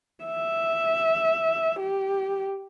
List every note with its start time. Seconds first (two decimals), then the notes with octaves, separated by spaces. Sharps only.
0.24 E5
1.79 G4